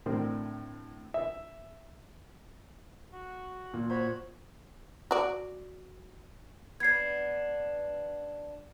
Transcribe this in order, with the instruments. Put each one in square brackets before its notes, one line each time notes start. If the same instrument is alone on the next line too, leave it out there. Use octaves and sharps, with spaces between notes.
[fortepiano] A2 D3 C4 A#4 C5
E5
[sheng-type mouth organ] F#4
[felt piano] A#2
[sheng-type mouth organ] F#4 C#5 B5 [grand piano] C5
[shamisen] F#4 D5
[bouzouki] B3 D4 [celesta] G#6 C7